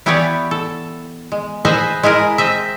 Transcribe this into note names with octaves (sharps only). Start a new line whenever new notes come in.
E3 B3 E4 G4 C#5 D5
A4
G#3
G#4 B4 C5 D#5 E5 G#5
G#3 E4 G#4 A#4
C4 D#5 E5